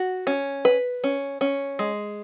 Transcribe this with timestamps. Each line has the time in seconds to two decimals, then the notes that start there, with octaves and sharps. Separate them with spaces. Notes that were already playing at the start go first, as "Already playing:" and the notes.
Already playing: F#4
0.27 C#4
0.65 B4
1.04 C#4
1.41 C#4
1.79 G#3